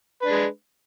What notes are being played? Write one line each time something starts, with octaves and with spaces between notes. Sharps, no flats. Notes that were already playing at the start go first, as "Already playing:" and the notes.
G#3 D4 B4